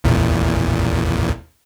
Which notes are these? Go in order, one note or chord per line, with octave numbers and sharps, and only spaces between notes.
A1 E2 A#2